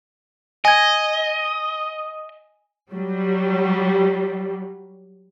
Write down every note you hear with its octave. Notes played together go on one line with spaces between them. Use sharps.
D#5 G#5 G#6
F#3 G3